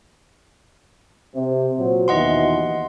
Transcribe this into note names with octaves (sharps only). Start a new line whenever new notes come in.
C3
A#2 F#3 C5
D#2 B2 E3 D#5 F#5 C6